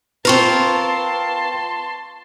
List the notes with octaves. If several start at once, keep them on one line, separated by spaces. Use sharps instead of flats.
C4 F4 A#4 B4 A5 C6 C#6